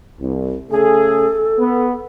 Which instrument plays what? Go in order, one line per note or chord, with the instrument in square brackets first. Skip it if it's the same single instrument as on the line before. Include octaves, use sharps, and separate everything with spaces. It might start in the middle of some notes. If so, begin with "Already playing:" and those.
[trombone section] C2
[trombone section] C#3 A3 G#4 [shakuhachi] A4
[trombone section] B3